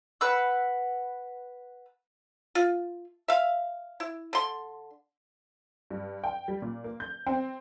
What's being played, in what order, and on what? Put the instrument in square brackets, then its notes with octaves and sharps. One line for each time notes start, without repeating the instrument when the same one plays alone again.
[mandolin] B4 F#5 E6
[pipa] F4
E5 F5
E4
D3 C6
[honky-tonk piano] G2
G5
G3
A#2
A#3
G6
C4